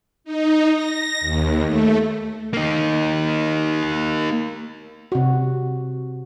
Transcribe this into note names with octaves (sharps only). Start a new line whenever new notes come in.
D#4
A#6
D#2
A3
A#3 D#4
C3 F#4